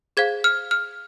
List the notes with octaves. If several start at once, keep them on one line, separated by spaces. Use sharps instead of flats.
G#4 C5 F5 G#6
F6
F6